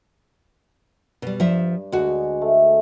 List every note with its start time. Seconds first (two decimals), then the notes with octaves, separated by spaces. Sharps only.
1.22 B2 G3
1.40 G2 F3 E5
1.92 D2 G#3 F#4
2.42 A3